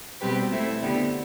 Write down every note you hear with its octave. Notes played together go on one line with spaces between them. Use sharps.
B2 G3 C4 G4 B4
A3 C4 E4
D3 G3 B3